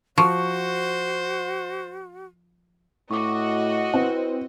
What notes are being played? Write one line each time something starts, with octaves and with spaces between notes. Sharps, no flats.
F3 F#4 C5 C#6
A2 F#4 D#5 C#6 D6
C4 E4 B4